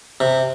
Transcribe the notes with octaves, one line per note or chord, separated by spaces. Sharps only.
C3